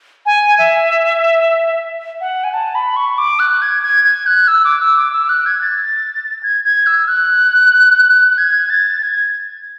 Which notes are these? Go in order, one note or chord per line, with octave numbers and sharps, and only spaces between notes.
G#5
E5
F#5
G#5
A5
B5
C#6
D6
F#6
G#6
G#6
G#6
F#6
E6
D6
E6
D6
E6
F#6
G#6
A6
G#6
G#6
E6
F#6
F#6
G#6
A6
G#6